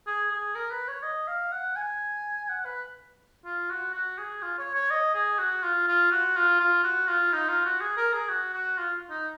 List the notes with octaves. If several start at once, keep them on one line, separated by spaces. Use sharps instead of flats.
G#4
G#4
A#4
B4
C#5
D#5
F5
F#5
G#5
F#5
B4
F4
F#4
F#4
G#4
F4
C#5
C#5
D#5
G#4
F#4
F4
F4
F#4
F4
F4
F#4
F4
D#4
F4
F#4
G#4
A#4
G#4
F#4
F#4
F4
D#4